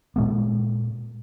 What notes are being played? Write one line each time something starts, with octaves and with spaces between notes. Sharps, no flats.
A#2 G#3 B3